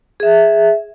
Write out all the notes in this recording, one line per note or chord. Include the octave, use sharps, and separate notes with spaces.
G#4 E5